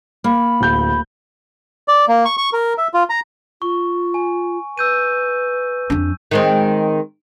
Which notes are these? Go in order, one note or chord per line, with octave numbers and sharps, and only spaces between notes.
A#3 B5
D1 G6
D5
A#3
C#6
C#6
A#4
E5
F4
A#5
F4 C#6
G#5
B4 E6 G6 D#7
F2 D4
D#3 G#3 C4